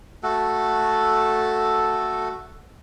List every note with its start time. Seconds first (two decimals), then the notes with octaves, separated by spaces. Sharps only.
0.23 A3 F#4 A4